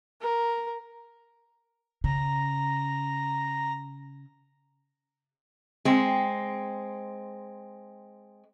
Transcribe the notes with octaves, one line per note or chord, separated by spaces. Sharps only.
A#4
C#3 A#5
G#3 C4